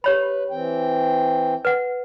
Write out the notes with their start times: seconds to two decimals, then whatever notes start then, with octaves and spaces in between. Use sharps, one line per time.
0.04 G4 B4 C#5 B5
0.50 E3 C4 G5
1.65 B4 F#5